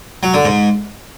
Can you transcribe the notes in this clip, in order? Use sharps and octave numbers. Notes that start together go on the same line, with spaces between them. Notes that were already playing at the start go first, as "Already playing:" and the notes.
F#3
D3
G#2